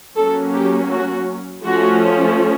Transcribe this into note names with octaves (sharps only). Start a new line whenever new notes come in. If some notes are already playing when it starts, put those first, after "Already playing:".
F#3 A#3 C#4 A4
G4
F#4
F3 A3 C#4 F#4